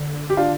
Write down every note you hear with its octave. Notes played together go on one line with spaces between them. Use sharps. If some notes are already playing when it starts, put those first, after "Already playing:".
Already playing: D3
G4
D4 F4